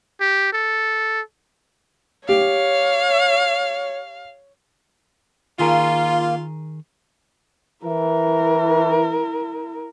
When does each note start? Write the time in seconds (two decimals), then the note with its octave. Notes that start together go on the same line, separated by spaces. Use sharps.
0.21 G4
0.53 A4
2.29 G4 C#5 F5
5.59 D#3 A#3 F4 G#4 A#4
7.85 E3 E4 A#4